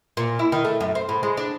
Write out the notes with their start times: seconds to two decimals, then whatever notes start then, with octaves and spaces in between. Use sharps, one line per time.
0.17 A#2
0.39 E4
0.52 D#3
0.64 A3
0.80 F#2
0.95 C5
1.09 A2
1.23 G#3
1.37 D4